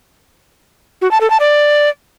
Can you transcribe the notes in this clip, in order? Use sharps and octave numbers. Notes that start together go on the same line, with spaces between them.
F#4
A5
A4
A5
D5